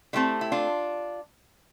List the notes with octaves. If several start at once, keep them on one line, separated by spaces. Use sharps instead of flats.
D3 A3 C4 E4 G4
E4
D4 F4